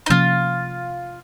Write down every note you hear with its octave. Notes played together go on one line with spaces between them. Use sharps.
D#4
C3 F3 A#3 C#4 F4